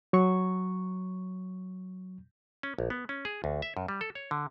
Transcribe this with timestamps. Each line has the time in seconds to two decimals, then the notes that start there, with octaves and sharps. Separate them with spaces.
0.13 F#3 C#6
2.63 C#4
2.79 A#1
2.90 B3
3.09 C#4
3.25 G#4
3.44 D2
3.62 E5
3.77 F#2
3.88 G3
4.01 A4
4.15 C#5
4.31 D3